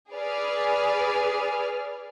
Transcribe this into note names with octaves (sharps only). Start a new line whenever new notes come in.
G#4 B4 D5 F6